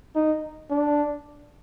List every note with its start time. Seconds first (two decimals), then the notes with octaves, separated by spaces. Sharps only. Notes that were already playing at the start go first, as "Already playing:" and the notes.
0.15 D#4
0.70 D4